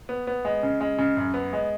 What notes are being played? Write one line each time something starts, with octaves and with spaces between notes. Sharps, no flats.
B3
B3
G#3
C#3
G#3
C#3
F#2
B3
G#3